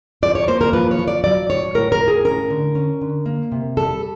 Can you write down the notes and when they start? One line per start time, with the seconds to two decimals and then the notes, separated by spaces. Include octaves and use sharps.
0.23 F3 D5
0.35 C#5
0.48 A#3 C5
0.61 A#4
0.73 F3 B4
0.91 C#5
0.99 F3
1.08 D5
1.24 F#3 D5
1.49 A2 C#5
1.75 A2 A#4
1.92 A#4
2.01 A2
2.08 G#4
2.25 C#4 A#4
2.50 D3
2.75 C#4
3.01 D3
3.26 A#3
3.52 C3
3.77 G3 A4